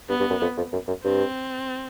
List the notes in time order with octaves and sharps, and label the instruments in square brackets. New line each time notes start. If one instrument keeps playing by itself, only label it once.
[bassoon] G2 [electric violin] B3
[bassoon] G2
F#2
F2
F2
F#2
F#2
[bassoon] G2 [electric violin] C4